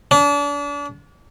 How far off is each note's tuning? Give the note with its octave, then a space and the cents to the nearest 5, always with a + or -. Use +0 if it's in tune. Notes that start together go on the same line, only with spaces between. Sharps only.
D4 -35